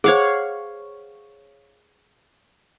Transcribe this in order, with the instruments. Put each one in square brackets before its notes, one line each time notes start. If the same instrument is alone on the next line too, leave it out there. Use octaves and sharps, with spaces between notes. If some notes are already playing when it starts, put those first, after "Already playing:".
[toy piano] G#4 C5 [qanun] C#5 F5 F#5